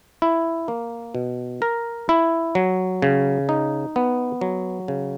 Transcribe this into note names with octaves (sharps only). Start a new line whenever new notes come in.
E4
A#3
B2
A#4
E4
F#3
C#3
D#4
B3
F#3
C#3